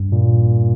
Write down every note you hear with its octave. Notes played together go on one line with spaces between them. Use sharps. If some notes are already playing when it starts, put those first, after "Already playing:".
Already playing: G2
A#2